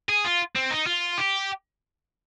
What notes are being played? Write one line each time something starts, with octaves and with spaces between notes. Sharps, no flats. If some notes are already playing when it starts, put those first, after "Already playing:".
G#4
F4
C4
D#4
F4
G4